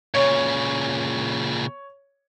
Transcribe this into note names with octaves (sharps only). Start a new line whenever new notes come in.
A#2 C#3 C#5